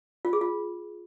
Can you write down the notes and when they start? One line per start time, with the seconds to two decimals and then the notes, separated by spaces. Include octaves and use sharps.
0.25 F4
0.33 G#4
0.41 F4